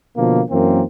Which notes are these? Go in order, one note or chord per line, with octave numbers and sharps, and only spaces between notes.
B2 D3 F3 A#3
F#2 E3 A#3 C4